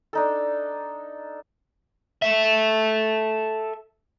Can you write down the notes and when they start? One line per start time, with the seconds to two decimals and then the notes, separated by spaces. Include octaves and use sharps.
0.13 D4 D#4 A4
2.22 A4 E5